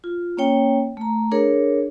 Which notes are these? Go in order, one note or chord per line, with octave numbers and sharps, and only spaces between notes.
F4
A#3 C#4 C#5 G5
A3 A#5
D4 G#4 A#4 C#5